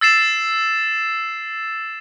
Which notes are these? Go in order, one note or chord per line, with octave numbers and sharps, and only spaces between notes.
E6 A6 C7 E7